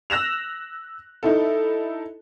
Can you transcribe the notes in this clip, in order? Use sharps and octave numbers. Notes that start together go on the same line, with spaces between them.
E6 F#6 A#6 E7 F7
D#4 E4 A4